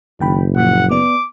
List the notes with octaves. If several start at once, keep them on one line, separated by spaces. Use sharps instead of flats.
F#1 D#3 G5 B5
A#2 C#3 F3 F#5
B3 D5 D6